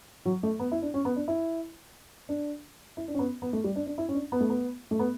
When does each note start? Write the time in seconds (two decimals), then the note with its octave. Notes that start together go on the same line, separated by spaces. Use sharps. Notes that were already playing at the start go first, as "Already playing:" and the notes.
0.25 F#3
0.43 A3
0.60 B3
0.72 E4
0.82 D4
0.94 C#4
1.05 B3
1.16 D4
1.28 E4
2.29 D4
2.97 E4
3.08 D4
3.15 C#4
3.19 B3
3.42 B3
3.53 A3
3.64 G3
3.76 D4
3.86 D4
3.98 E4
4.09 C#4
4.15 D4
4.32 B3
4.41 A3
4.50 B3
4.91 A3
4.99 B3